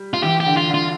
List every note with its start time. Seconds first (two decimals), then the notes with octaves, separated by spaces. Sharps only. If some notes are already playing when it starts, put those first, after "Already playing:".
Already playing: G3
0.14 F4
0.23 E3 G4
0.40 G4
0.46 D3
0.57 F4
0.69 D3
0.74 F4